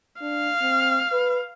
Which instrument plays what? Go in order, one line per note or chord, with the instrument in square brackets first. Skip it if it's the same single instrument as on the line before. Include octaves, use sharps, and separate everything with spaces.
[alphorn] D4 [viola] F5
[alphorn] C4
B4